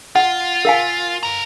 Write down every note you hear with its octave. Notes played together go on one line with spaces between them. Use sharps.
F4 F#5
A#4 F5 G#5
A4 A#5